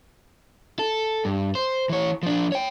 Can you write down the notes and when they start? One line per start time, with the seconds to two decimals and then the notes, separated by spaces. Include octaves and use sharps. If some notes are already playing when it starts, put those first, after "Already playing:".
0.79 A4
1.25 G2
1.55 C5
1.89 E3 C#5
2.23 F3 D4
2.52 C#5 G5